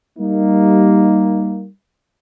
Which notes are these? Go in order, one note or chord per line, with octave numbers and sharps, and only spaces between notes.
G3 A#3 D#4